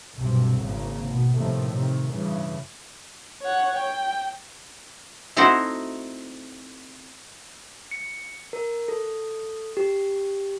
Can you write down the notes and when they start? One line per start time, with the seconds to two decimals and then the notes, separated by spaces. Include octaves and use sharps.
0.15 B1 G2 C3
0.61 G#1 C#3 A#3
1.07 B2
1.36 A2 C3 D#3 F3 A3
1.71 C3 D#3
2.09 G2 C#3 E3
3.43 C#5 F#5
3.78 G5
5.37 A3 C4 D#4 E4 F#4 C5
7.91 C#7
8.53 A#4
8.88 A4
9.77 G4